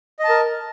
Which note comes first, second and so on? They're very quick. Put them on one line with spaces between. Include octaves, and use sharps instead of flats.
D#5 A5 A#4